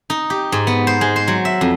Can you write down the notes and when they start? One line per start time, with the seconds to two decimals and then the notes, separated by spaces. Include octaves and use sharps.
0.10 D#4
0.30 G4
0.52 G#2
0.67 B3
0.87 C5
1.01 G#3
1.16 C5
1.28 F#3
1.45 E5
1.61 F2